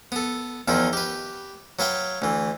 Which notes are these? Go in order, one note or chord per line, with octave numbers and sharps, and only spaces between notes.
B3 A4
E2 D#3 F3 E4 F4
G4 B4
F#3 B4 F5 G5
D2 E3